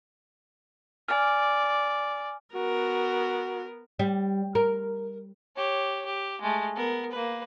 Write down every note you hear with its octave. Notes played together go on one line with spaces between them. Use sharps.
D5 G#5 F6
B3 F#4 A#4
G3
A#4
G4 C#5
G4
G#3 A3
B3 A#4
A#3 B4